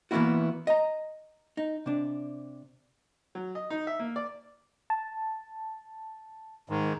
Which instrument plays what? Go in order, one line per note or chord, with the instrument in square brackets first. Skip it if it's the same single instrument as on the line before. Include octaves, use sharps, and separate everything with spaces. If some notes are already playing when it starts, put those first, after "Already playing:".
[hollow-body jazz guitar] E3 A#3 B3 C#4 E4 F#4
D#5 A#5
D#4
C3 D4
[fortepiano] F#3
D#5
D#4
E5
A#3
D5
[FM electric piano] A5
[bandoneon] G#2 D#3